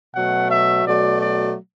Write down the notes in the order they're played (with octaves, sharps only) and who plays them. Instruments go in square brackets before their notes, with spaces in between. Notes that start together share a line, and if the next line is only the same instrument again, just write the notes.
[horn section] B2 F#3 A3 F#5
E5
B2 F#3 A3 D5
D5